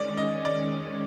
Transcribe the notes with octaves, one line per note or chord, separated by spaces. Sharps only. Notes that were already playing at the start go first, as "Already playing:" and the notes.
Already playing: D#3 G#3 C#4 D5
D#5
D5